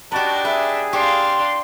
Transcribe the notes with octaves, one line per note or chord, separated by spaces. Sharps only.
D4 D#4 F#4 G4 B4 A5
G#4 B4 E5
D4 G4 F5 C6